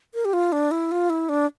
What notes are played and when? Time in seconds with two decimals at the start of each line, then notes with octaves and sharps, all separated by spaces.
0.14 A#4
0.25 G4
0.33 F4
0.52 D4
0.71 E4
0.91 F4
1.10 E4
1.29 D4